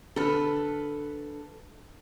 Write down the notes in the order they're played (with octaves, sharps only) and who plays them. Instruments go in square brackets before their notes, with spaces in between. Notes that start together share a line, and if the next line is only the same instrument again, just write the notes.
[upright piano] D3 F6 [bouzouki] A4 B4